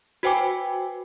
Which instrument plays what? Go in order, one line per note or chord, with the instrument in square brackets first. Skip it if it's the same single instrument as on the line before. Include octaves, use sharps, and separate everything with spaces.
[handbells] F#4 B4 C5 G5 G#5 D6